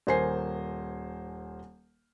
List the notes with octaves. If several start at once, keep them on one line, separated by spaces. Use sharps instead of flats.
D#1 A#4 C5 G#5 C7